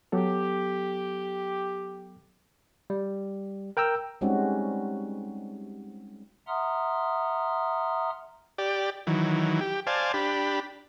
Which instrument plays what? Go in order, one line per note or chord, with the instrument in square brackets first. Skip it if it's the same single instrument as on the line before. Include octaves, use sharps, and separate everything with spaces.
[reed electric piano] F#3 B3 A4 [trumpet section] G4
[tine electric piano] G3
A#4 G5 A#5 E6
[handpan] G3 G#3 C4 C#4 D#4 F#4
[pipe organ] E5 F#5 A#5 C6 D#6 F6
[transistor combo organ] G4 D5
D#3 E3 F#3
G4
C5 D5 F5 G#5 A5
D4 G4 B5